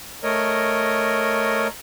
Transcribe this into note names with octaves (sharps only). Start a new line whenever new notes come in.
A3 A#4 C#5 D#5